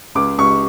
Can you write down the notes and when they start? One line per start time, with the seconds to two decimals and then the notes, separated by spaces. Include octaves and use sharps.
0.15 C#2 D6
0.38 C#2 C#6